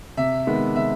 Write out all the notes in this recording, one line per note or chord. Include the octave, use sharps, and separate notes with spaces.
C3 E5
D#3 G#3 B3
C3 E5